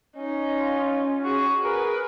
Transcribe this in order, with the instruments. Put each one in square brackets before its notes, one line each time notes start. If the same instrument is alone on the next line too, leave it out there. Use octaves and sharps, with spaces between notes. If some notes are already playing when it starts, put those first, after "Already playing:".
[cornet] C#4 [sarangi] D#4
[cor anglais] F4
[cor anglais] F#4 [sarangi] G#4
[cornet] G#4 [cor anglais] A#4 [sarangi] B4